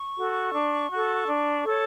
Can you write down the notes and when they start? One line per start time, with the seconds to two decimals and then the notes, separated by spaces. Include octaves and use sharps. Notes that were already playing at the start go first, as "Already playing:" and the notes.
Already playing: C#6
0.17 F#4 A4
0.53 D4
0.90 F#4 A4
1.27 D4
1.64 A4 C#5